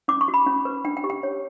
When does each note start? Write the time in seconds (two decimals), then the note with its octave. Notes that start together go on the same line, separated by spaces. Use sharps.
0.08 C#4 D6
0.21 C#6
0.28 F#4
0.34 B5
0.46 C#4
0.65 B4
0.85 D4 G5
0.97 G5
1.04 G4
1.10 G5
1.23 C#5